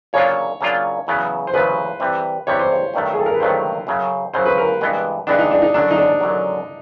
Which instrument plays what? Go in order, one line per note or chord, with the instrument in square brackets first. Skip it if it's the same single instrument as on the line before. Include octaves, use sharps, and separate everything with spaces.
[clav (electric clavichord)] C#3 F#3 A#3 D4 F4 [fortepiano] C#5
[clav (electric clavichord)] C#3 F#3 A#3 D4 F4
E2 C#3 F#3 B3
[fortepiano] C5
[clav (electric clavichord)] E2 C#3 F#3 B3 [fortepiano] B4
[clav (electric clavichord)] C3 E3 G3
[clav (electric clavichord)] C3 E3 G3 [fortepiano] C#5
[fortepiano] C5
C#5
[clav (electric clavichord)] G2 D#3 F#3 A3
[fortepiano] G#4
A4
A#4
B4
[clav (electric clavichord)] G2 D#3 F#3 A3 [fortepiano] C5
[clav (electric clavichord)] F#2 C#3 F#3
[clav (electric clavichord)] F#2 C#3 F#3 [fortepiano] C5
[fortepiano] B4
A#4
[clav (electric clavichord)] G2 E3 G#3 B3
[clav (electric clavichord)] G2 E3 G#3 B3 [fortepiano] D4
[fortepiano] D#4
D4
D#4
[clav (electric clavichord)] F#2 D3 F#3 [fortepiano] D4
[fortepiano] D#4
D4
[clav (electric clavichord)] F#2 D3 F#3